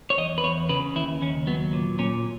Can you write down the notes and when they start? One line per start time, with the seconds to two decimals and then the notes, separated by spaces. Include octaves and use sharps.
0.10 C#5
0.18 E2 D#5
0.38 B4
0.44 E2 C#5
0.69 C#3 B4
0.96 D#2 E4
1.21 D#2 C#4
1.47 F#3 B3
1.73 A#2
1.99 A#2 C#4